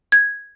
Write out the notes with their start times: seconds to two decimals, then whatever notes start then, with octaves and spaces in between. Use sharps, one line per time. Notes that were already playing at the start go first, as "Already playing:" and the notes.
0.12 G#6